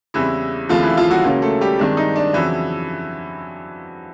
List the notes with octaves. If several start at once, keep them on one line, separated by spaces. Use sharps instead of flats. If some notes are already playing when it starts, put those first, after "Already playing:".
E2 C#3 E3 G3 C4 E4
D#2 C#3 E3 F3 A3 C4 F4
E3 E4
F3 F4
F#3 F#4
C#2 C#3 F#3 A#3 C#4
A3 A4
G3 G4
G2 D#3 G#3 C4 D4
D#4
D4
F2 C#3 E3 F#3 E4